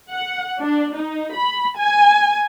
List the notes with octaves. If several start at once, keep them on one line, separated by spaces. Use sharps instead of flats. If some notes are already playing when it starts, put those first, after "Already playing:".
F#5
D4
D#4
B5
G#5